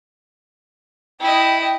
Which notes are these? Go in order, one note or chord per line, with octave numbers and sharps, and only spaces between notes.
E4 D#5 G5